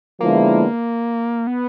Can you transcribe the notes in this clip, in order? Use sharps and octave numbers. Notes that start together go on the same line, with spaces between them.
D3 F3 G#3 A#3 B3 E4
B3